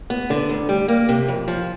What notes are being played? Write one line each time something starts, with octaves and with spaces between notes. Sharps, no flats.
B3
D3
D2
G3
A#3
C3
F2
F3